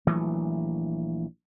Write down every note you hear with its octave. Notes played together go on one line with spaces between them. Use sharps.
A#1 E3 F#3 A3